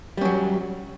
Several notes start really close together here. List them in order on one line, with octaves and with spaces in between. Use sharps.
G3 C#4 F#3